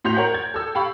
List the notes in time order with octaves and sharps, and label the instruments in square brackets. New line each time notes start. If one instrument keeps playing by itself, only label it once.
[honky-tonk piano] A2 F#4 C6 G6 F7
A#4 C#5 F#5
G#6
A4 E6
G4 F5 B5 C#6